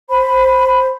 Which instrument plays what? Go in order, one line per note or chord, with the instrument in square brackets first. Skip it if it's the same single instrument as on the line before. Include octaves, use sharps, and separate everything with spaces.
[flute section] C5 B5